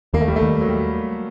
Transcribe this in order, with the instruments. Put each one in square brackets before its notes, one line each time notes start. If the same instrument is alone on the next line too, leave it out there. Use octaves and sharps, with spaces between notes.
[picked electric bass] D#2 [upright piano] A#3
[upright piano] A3
G3
A3
[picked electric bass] D#2
[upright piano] F#3
G3